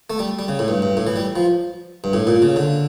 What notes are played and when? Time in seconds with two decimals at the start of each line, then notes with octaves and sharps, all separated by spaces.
0.10 A3
0.19 G3
0.39 G3
0.48 C#3
0.59 A2
0.68 G2
0.82 G2
0.97 A2
1.07 E3
1.16 G3
1.36 F3
2.04 G2
2.13 A2
2.27 A#2
2.42 C#3
2.56 D3